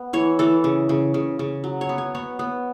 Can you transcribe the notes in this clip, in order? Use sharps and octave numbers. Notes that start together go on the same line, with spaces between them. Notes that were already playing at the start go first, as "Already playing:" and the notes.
Already playing: B3
E3 C#5
E3 A4
C#3
C#3
C#3
C#3
F#3
C#5
B3
C#5
B3 C#5
B3